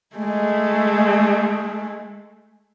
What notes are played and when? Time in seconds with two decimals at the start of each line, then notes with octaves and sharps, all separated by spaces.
0.16 G#3 A3